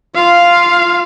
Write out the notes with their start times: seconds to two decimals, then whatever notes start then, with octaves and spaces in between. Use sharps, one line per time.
0.15 F4 F5
0.81 F4